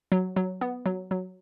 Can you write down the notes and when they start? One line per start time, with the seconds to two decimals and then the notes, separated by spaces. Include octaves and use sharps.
0.12 F#3
0.36 F#3
0.61 B3
0.86 F#3
1.11 F#3